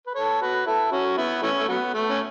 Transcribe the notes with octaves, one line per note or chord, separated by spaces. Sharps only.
B4
A4 C#5
F#4 B4
E4 A4
C#4 F#4
B3 E4
E3 A3 C#4
A3
F#3 B3
A3
C#4